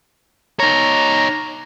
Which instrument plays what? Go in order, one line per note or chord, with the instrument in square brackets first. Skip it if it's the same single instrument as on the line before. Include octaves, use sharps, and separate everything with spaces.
[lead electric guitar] D#4 C#5 [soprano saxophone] A#5